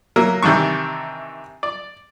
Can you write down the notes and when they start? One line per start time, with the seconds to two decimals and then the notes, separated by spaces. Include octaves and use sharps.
0.16 F#3 A#3 A#4 E5
0.43 C3 D#3 E3 D4 C#6
1.63 D5